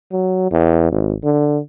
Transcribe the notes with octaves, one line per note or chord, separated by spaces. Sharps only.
F#3
E2
G#1
D3